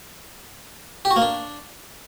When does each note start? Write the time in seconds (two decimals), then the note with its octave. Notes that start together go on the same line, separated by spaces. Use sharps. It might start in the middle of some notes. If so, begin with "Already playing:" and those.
1.05 G4
1.11 F#4
1.16 A#3
1.22 D4